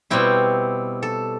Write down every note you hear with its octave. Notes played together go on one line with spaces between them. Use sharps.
B2 G3 C4 E4 G5
A4